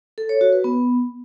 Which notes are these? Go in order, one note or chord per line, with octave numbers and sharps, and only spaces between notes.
A4
C#5
F#4
B4
B3